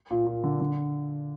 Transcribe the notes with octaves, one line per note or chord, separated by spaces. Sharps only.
A#2
A#2
D3
D3